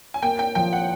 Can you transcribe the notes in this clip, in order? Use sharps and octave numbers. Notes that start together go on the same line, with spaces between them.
G#5
A#3 G5
G5
F3 G5
F#5